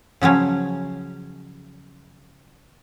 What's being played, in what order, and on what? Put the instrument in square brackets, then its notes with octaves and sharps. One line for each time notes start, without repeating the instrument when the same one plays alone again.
[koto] C#3 F3 F#3 C#4